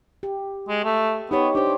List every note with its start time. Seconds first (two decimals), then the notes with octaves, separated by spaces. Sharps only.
0.23 G4
0.69 G#3
0.84 A3
1.31 B3 D#4 G4 C#5
1.55 D4 G4 C5